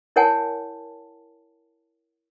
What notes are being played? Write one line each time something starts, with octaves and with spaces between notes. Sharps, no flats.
E4 A#4 C#5 F#5 G#5 A5